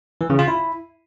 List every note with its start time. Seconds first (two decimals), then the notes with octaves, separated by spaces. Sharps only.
0.21 E3
0.30 C#3
0.39 F4
0.48 E4